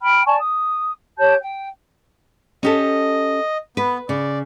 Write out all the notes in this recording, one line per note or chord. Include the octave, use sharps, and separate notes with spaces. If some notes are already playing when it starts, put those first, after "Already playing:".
G5 B5 F6
D5 G#5 A5 C#6
D#6
G4 C#5 A5 G6
G5
C#4 G4 A4 D#5
B3 B4
C#3 D5